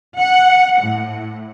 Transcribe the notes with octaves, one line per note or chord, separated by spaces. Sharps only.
F#5
A2